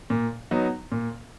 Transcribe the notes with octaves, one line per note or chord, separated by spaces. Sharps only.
A#2
F#3 B3 D#4
A#2